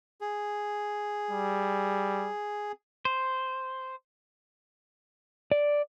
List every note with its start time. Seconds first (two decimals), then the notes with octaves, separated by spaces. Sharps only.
0.21 G#4
1.31 G3
3.05 C5
5.52 D5